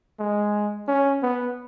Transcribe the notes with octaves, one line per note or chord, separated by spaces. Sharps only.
G#3
C#4
B3